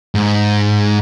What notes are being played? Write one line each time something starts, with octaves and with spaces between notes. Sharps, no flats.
G#2